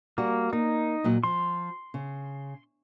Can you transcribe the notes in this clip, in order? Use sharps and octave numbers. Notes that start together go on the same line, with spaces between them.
G3 A#3 F#4
A#3 D#4
A#2 F#3 D#5
F3 C6
C#3